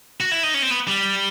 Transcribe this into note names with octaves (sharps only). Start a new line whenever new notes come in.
F#4
E4
D#4
C#4
C4
B3
G3